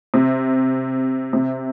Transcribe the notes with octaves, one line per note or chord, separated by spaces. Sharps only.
C3
C3